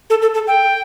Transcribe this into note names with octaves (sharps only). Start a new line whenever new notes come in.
A4
A4
A4
G5